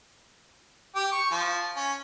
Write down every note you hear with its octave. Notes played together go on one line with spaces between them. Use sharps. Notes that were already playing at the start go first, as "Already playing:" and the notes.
G4
C#6
F3
C#4